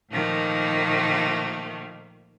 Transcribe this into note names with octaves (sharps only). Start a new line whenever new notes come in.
A#2 D#3 F3 A3 A#3